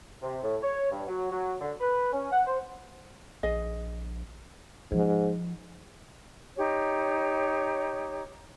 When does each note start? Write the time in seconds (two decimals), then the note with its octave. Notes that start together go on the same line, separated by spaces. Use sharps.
0.22 C3
0.43 A2
0.63 C#5
0.91 G2
1.07 F#3
1.32 F#3
1.61 D3
1.81 B4
2.13 C#4
2.32 F#5
2.47 C5
3.43 A#1 G#4 D#5
4.92 G#2 F3
6.58 D#4 G4 C#5